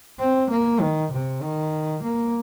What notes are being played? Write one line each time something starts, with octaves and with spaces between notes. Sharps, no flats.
C4
A#3
D#3
C3
D#3
A#3